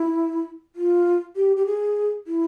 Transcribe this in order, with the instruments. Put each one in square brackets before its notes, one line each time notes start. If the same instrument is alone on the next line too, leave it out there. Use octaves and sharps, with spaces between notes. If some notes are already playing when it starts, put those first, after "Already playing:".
Already playing: [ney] E4
F4
G4
G4
G#4
E4